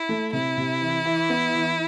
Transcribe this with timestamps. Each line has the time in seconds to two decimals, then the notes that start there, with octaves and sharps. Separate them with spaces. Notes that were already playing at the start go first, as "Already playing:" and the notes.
Already playing: E4
0.09 A3
0.33 C3 E4
0.57 C3
0.81 E3
1.05 E3
1.30 B3
1.55 E3